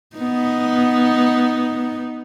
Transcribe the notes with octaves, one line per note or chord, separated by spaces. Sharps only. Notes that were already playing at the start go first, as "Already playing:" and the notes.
B3 D#4